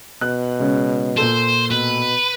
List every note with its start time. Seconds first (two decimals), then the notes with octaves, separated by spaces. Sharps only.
0.21 B2 F#6
0.59 C#3 G#3 C#4
1.17 A#2 A4 C5
1.71 B2 B4